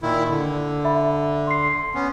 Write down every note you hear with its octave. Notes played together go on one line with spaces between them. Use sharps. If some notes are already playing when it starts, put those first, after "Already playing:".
A#2 D#3 E4
D3
E5 B5
C6 C7
B3 C#4